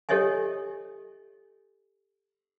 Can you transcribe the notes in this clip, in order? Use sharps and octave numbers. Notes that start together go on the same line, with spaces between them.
G4 A4 C#5 D#5 E5 G#5